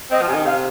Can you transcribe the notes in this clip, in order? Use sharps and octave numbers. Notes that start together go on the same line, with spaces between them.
C4 D#5
F3
C3 G#5
D#3
C3 F5